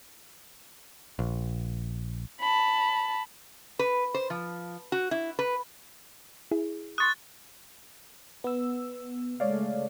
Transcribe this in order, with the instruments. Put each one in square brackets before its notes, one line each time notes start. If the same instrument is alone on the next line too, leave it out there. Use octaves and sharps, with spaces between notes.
[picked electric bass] A#1
[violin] A5 B5
[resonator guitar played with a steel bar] B4
C5
F3
F#4
E4
B4
[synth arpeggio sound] E4 G#4
[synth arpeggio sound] C6 C#6 D#6 [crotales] F#6 A6
[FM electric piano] B3 E6
[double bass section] C#3 G#3 A3 [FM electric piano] C#5 D5 F5